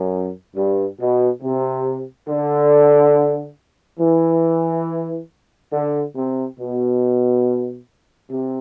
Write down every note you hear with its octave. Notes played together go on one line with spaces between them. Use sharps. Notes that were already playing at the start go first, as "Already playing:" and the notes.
Already playing: F#2
G2
B2
C3
D3
E3
D3
C3
B2
C3